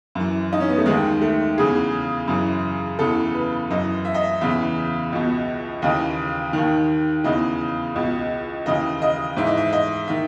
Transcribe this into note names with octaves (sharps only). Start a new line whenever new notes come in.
F#2 E3
D#4
C#4
B3
A3
D#2 D#3 G#3
A3
E2 C#3 E3 G#4
F#2 C#3 E3
E2 C#3 E3 A4
B4
F#2 E3 D#5
E5
D#5
E5
E2 C#3 E3 E5
C#2 B2
D#2 C#3 E3 D#5
D#2 D#3
E2 C#3 E3 D#5
C#2 B2
D#2 C#3 E3 D#5
D#5
G#2 E3 E5
D#5
E5
D#5
D#3 E5